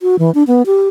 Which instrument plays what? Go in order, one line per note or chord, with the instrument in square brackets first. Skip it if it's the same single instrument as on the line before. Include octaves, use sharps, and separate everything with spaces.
[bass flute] F#4
E3
D4
B3
G4